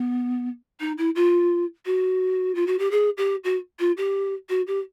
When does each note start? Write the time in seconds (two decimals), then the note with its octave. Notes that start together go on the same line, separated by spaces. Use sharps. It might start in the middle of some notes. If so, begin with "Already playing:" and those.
Already playing: B3
0.80 D#4
0.98 E4
1.16 F4
1.86 F#4
2.55 F4
2.67 F#4
2.79 G4
2.91 G#4
3.18 G4
3.44 F#4
3.79 F4
3.97 G4
4.49 F#4
4.67 G4